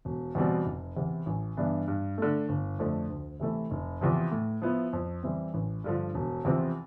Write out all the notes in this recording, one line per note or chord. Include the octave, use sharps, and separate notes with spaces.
E1
E2 B2 G3 C4
F1
E2 C3
A1
G2 E3 B3 D4
G2
D3 A3
G1
F2 D3 A3
D2
C3 E3 A3 E4
F1
E2 C3 F3
A2
F3 B3 E4
F2
E3 G3 C4
A1
G2 D3 F3
E1
E2 C3 F3 C4